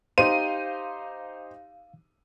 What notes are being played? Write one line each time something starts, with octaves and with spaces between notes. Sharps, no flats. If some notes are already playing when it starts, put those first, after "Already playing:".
D#4 G4 C5 F5 D#7